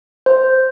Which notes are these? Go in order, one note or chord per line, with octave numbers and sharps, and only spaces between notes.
C5